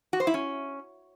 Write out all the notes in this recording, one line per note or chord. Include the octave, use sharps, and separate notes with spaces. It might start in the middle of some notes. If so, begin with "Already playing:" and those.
F#4
C5
E4
C#4